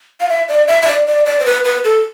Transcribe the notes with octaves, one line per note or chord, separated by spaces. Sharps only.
F5
E5
D5
E5
E5
D5
D5
D5
C5
B4
B4
A4